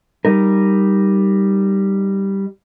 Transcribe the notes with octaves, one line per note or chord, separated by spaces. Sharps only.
G3 D#4 A#4